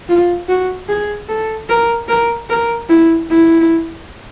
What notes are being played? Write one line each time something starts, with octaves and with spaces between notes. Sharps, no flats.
F4
F#4
G#4
A4
A#4
A#4
A#4
E4
E4